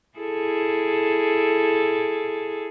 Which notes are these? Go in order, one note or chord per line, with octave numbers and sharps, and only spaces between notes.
E4 G#4 A4